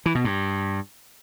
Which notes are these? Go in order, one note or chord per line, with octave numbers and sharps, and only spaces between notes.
E3
B2
G2